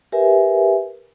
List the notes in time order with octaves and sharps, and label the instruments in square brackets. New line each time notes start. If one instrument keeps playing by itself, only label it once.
[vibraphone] G4 A#4 B4 E5 G#5